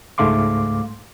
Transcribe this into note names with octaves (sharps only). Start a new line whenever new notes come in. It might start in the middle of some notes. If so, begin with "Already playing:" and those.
C#2 G#2 A3 F5 C6 D6